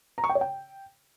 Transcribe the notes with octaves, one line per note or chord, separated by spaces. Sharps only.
A#5
C#6
G5
C#5
G5